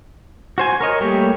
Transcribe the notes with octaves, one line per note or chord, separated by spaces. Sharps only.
F#4 C5 G#5
A#4 C#5 D#5
G3 A3 A#3 G4 C#5